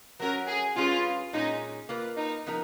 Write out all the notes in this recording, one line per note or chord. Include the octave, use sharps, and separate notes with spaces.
F#3 C#4 F#4 A#4
G#4
G#3 C#4 F4 G#4 B4
A#2 G#3 C#4 D#4
A#3 F4 B4
D#4
F3 B3 D#4 A#4